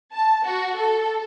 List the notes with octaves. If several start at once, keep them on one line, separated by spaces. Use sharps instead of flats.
A5
F#4
A4